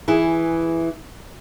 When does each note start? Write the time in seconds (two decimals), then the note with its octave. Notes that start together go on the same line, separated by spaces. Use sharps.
0.08 E3 E4 G#4